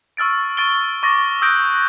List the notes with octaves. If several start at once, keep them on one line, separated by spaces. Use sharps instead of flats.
C#6 E6 F6 A6 D7
C#6 A6 D7 G7
C#6 D6 A6 A#6
D#6 E6 F#6 G6 A#6 D7